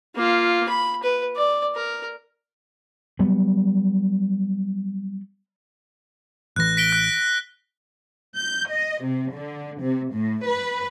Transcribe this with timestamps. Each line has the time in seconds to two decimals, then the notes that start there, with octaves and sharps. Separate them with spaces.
0.15 A#3 F4
0.69 B5
1.03 B4
1.36 D5
1.76 A#4
3.19 F#3 G3 B3
6.56 A1 E3 F#6 A#6
6.77 B6 D7 G7
6.92 F#6
8.35 G6
8.70 D#5
9.02 C3
9.33 D3
9.81 C3
10.13 A2
10.46 B4